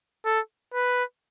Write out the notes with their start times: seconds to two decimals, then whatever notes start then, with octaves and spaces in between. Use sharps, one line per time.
0.25 A4
0.74 B4